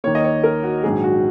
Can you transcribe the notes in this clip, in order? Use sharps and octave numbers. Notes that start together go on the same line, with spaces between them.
D#2 D#3 A#3 C#5
D#5
C#5
A#4
F#4
A#1 G#2 D#3 F#3 G#4
F#4